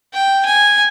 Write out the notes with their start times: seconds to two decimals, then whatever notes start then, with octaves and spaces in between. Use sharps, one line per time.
0.14 G5
0.45 G#5